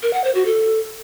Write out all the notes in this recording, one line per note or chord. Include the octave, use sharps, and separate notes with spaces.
A#4
F#5
C5
F#4
A4